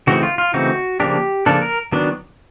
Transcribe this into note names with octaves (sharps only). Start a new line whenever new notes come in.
C#3 E3 A3 C4 D#4 F#4
F4
F4
C#3 E3 A3 C4 D#4 F#4
C#3 F3 A#3 D4 G4
C#3 F3 A#3 D4 A4
A#4
D#3 F#3 B3 D4